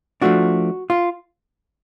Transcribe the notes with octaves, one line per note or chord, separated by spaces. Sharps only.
F3 A3 D4 F#4
F4